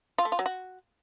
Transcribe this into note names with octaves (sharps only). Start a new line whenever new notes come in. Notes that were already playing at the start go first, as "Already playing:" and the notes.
F4
A3
F4
F#3
F#4